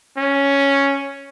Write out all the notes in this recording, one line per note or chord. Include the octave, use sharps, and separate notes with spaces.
C#4